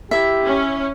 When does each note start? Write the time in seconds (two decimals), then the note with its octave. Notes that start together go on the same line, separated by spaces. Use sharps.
0.11 E4 G4 E5
0.44 C#4